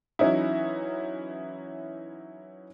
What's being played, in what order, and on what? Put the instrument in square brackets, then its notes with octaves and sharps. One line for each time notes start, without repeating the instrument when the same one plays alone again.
[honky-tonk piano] E3 F#3 C#4 D#4 E4